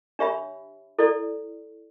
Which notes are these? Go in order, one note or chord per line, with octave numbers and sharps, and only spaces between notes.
D4 G4 C#5 E5 B5
E4 A4 D5